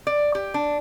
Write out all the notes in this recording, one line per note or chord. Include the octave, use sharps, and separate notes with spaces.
D5
G4
D4